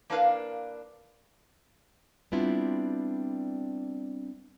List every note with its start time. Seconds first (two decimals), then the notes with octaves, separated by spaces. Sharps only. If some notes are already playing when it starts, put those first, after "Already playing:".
0.10 A#3 D4 E4 A#4 B4 F5
2.32 G3 B3 C4 D4 E4 F4